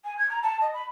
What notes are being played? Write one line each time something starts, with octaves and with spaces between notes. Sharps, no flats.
G#5
G#6
A#5
A5
D#5
B5